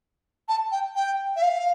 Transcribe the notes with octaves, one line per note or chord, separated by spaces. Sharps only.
A5
G5
G5
E5
F5